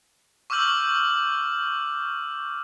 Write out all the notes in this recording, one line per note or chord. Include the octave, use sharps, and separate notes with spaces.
C#6 D6 E6 F6 G6 F#7